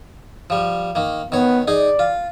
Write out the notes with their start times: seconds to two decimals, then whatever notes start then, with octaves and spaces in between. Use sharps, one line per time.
0.50 F3 G3
0.95 D#3 A#3
1.32 D#3 B3 C#5
1.68 D#4 G#4 D5
1.99 F4